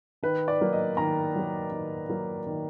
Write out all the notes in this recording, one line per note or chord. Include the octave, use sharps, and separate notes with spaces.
D#3 B4
D5
F#3 A#3
D#5
D#3 A#5
F#3 A#3
D#3
F#3 A#3
D#3